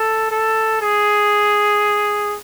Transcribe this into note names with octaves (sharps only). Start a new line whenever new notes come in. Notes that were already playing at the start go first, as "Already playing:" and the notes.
Already playing: A4
A4
G#4